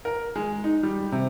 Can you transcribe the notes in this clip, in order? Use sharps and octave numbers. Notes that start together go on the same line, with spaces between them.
A#4
G#3
D#4
G3
C3